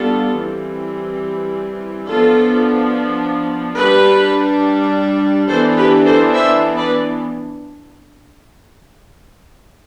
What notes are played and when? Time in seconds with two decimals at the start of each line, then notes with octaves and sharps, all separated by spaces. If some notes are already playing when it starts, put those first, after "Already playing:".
Already playing: G3 B3 D4 F4 A4
0.37 E3 G3 C4
2.07 F3 B3 D4 F4 A4
3.78 G3 D4 G4 B4
5.48 E3 B3 D4 A4 C5
5.77 G4 B4
6.05 A4 C5
6.33 C5 E5
6.76 B4 D5